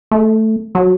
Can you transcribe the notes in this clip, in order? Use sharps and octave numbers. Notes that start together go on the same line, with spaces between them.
A3
F#3